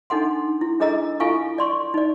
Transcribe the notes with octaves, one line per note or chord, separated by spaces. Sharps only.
D4 D#4 A4 F#5 C6
E4
D4 G#4 A4 D#5 A#5 E6
E4 F4 A4 F5 G#5 C#6
D5 C6 C#6
D#4 D5